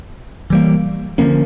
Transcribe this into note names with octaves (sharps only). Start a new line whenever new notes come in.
E3 G3 A#3
D3 F3 A#3 C#4